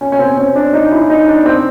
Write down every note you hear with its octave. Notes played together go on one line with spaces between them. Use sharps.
C#4
C#4
C4
C#4
D4
D#4
E4
D#4
D4
C4